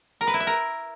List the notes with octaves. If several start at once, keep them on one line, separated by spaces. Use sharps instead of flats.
A#4
B4
E4
E5
A#4